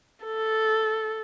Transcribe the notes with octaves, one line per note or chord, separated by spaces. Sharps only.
A4